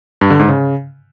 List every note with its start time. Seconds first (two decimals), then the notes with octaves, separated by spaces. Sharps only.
0.21 G2
0.30 D3
0.40 G#2
0.49 C#3